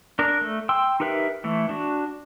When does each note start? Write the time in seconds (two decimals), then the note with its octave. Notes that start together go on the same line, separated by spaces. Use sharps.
0.19 D4 A#4
0.41 A3
0.69 G5 C6 E6
1.00 D#4 G4 A#4 B4 E5
1.44 E3 A3
1.69 D4 F#4